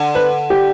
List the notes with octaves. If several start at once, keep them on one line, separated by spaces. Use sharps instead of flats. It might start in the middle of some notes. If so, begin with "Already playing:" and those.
Already playing: D3
B4
G4